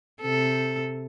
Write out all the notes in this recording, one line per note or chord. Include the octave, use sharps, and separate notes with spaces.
C3 A4